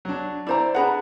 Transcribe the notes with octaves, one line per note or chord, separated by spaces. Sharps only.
F#3 D4
C4 E4 C5 D5 A#5
D4 G#4 B4 F#5 A#5 B5